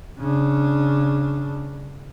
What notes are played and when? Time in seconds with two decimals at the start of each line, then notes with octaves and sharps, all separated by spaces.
0.19 C#3 D4